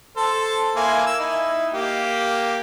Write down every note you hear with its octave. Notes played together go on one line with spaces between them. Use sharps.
A4 C5
A#3 E4 G#5
E6
D#4 E4
A#3 G4